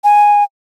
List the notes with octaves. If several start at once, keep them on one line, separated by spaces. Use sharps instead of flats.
G#5